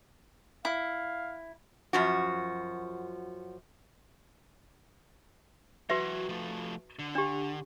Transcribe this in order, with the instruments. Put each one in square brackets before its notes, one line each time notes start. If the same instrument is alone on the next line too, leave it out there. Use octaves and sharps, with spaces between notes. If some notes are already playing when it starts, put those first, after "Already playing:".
[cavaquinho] E4 [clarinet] F5
[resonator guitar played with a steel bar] F#2 F3 F#4
[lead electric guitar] E3 F#3 [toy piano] F#4 B4 E5
[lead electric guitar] F3 A3
D3
[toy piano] D4 G4